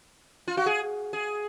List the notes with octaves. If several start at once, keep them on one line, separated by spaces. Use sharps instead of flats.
F4
F#4
G#4
G#4